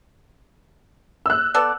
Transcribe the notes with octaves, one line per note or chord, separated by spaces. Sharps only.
E6 F#6
B3 A4 D5